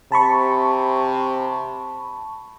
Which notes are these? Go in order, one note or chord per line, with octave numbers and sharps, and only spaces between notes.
C3 A5 B5 C#6